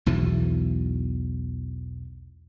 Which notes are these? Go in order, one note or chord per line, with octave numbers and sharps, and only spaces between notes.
B1 E2 B2 E3